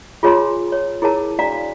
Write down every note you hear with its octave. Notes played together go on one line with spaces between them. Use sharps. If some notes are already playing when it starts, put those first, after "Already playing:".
F4 G#4 C#5 G#5 A#5 C6
C#5
E4 G#4 A#4 C#5 A5 A#5
D4 F#4 D5 F5 A#5